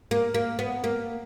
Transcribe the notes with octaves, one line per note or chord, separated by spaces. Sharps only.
A#3
A#3
B3
A#3